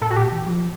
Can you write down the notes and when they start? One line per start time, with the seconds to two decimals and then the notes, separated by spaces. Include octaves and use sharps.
0.01 A2 A4
0.10 F#4
0.16 A#2 G4
0.32 E3
0.47 F3